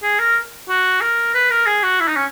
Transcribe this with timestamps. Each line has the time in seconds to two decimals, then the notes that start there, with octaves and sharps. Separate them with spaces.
0.03 G#4
0.19 A#4
0.69 F#4
1.01 A#4
1.34 B4
1.50 A#4
1.66 G#4
1.83 F#4
2.00 E4
2.08 D#4
2.16 C#4